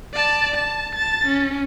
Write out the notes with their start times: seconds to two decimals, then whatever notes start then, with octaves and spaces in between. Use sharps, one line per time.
0.14 D5 A5
0.55 A5
0.95 A5 A6
1.26 C#4